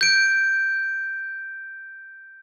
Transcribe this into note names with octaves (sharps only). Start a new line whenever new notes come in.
G6 D7